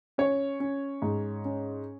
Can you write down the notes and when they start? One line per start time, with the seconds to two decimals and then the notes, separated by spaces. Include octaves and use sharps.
0.18 C#4 C#5
0.60 C#4
1.02 G#2
1.45 C#4